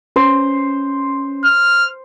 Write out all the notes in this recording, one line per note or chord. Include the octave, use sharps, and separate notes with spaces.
C#4 C5
F6